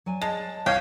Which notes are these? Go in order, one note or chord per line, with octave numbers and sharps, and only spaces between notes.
F#3 D5 G#5
G#3 A5
C2 C#5 F5 G5